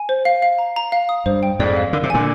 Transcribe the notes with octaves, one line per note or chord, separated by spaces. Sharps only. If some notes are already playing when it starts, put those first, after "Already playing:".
Already playing: G#5
C5
F5
F5
A#5
A#5
F5
D#6
G2 C5
G5
F2 G#2 D5
F5
D3 A#4
C3
A#2 D3 G#5